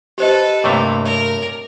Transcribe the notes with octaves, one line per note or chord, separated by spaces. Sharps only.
G4 A4 B4 C5 D#5
G2 C3 A3 A#3 C#5 C#6
A#4 C#5